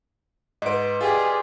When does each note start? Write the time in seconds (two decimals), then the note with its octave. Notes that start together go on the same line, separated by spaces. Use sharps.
0.62 G#2 B4 D#5 D7
1.01 F4 G4 G#4 D5 G5